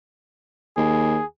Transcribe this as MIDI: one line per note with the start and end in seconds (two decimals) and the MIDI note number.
0.77 1.18 39
0.77 1.25 68